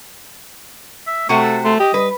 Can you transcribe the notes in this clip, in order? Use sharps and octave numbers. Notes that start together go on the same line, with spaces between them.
E5
C3 A3 F#4 C5 C#6
A4
A3 C6
G4 D#5
G3 B4